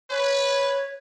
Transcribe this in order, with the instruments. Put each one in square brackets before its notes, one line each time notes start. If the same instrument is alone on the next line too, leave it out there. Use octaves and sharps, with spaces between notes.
[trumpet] B4 [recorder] C#5